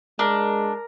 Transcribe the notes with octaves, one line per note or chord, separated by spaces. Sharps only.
G#3 D4 A#4